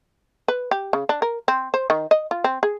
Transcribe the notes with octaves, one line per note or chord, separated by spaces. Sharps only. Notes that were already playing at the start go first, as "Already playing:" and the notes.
B4
G4
C#3
D4
A#4
C4
C5
D#3
D#5
F4
C4
G#4